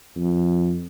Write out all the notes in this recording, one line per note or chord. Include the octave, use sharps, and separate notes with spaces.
F2